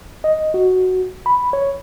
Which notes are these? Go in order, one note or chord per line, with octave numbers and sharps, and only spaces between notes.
D#5
F#4
B5
C#5